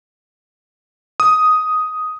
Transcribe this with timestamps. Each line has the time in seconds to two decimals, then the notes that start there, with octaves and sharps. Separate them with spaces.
1.20 D#6